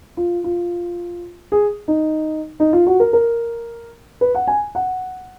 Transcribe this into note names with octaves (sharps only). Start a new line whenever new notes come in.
F4
F4
G#4
D#4
D#4
F4
F#4
A#4
A#4
B4
F#5
G#5
F#5